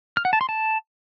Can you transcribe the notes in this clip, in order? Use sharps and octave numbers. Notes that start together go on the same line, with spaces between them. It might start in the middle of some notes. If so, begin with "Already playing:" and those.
F6
F#5
A5
C6
A5